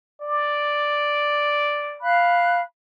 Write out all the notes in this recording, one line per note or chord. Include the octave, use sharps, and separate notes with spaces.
D5
F5 B5 F#6